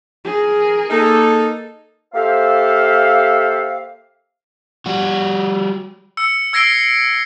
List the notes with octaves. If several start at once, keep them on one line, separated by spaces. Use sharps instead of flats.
G#4 A#4
A#3 D#4 A4
A#3 G4 A4 C5 E5 F5
G3 F#4
E6 C#7
E6 G#6 A#6 C7 D7 G7